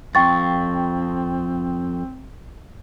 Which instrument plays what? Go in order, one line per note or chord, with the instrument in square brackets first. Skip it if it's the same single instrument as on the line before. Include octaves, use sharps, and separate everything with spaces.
[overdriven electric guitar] F2 [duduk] C4 [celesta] G5 C#6 A6